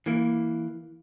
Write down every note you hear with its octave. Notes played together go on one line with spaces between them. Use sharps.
E3 A#3